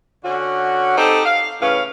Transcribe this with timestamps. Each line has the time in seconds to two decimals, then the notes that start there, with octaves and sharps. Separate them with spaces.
0.24 D3 C#4 F#4
0.98 C4 D#4 G4 A4
1.25 F5
1.61 A2 C#3 C#4 B4 F5